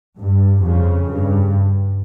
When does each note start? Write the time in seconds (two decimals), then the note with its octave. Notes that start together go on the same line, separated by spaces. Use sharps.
0.19 G2
0.63 F2 C#3
1.09 G2